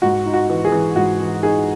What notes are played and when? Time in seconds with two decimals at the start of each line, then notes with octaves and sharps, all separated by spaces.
0.02 G#2 F#4
0.26 D#4
0.34 F#4
0.50 E3
0.65 G#4
0.72 E3
0.96 G#2 F#4
1.20 E3
1.43 D#4 G#4